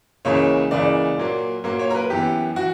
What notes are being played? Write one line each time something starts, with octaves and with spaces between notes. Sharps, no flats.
C#2 C#3 E3 A#3 C#5
C#2 C#3 E3 A#3 D5
A#2 F#3 A#3
A#2 F#3 A#3
C#5
A#4
B4
F#2 E3 B3 G4
E3 F#4